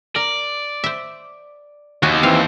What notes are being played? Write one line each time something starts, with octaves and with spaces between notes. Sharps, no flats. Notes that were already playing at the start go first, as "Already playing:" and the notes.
A#4 D5
C5 E5
D#2 F#4 G#5
E3 C4 F5